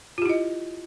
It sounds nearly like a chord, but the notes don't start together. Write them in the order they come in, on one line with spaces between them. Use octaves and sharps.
F4 G4 E4 D#5